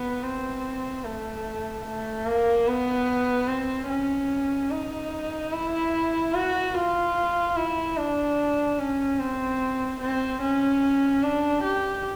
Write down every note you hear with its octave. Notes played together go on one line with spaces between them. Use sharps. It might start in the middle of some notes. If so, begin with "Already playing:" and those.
Already playing: B3
C4
A3
A3
A#3
B3
C4
C#4
D#4
E4
F#4
F4
E4
D4
C#4
C4
C4
C#4
D4
G4